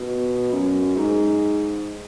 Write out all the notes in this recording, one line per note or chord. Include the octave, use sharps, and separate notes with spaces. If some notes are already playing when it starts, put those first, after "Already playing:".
Already playing: B2
F#2
G#2